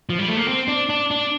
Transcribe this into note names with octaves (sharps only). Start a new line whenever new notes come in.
F3
G3
A3
A#3
C4
D4
D4
D4